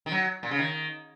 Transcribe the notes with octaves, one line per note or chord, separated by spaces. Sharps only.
D#3
F#3
A#2
C#3
D#3